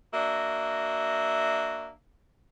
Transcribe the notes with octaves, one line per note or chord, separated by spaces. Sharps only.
A#3 D4 F#4 E5